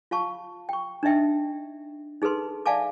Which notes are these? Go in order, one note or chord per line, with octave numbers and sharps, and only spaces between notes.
F4 F5 A5 C#6
G5 C#6
D4 D#4 D#5 E5 G5
D#4 G#4 A4 B4 C6
D5 E5 F5 G#5 A5 D6